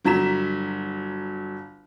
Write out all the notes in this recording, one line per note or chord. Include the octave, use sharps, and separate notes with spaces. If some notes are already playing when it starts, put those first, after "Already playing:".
G1 F#3 A#5 B6 E7